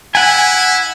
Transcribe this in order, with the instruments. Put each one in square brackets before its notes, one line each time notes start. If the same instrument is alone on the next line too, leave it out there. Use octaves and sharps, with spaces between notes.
[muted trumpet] E4 [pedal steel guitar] F#5 G#5